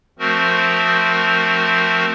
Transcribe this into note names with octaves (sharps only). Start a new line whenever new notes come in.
F3 A3 C4 F#4 A#4